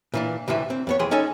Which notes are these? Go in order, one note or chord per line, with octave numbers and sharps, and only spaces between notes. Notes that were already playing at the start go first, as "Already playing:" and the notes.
A#2 E3 D4
D2 A2 C3 E3 E5
C4
F2 B3 C#5
F2 E3 G#4 G5 C6
C#4 D#4 A4 C#5 D#5 G#5